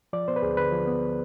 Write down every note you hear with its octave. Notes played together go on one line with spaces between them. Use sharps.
F3 D5
B3 C5
B4
D2 G#4
D3 B4
F3
B3